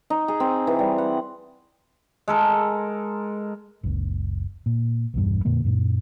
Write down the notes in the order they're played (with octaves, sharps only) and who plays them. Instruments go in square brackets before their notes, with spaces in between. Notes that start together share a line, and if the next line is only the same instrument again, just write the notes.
[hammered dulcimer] D#4
G#4
C4
E3
G3
F#5
G#3 A4 A#4
[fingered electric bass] F#1 C#2
A#2
B1 E2 G2
F2 A#2 D3 A#3
F#2 A#2